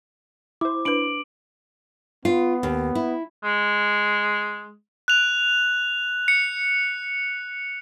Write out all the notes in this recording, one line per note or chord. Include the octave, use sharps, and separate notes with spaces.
E4 C5 D6
D4 B4 D7 F#7
B3 F4
D#2
E4
G#3
F#6 F7
C#7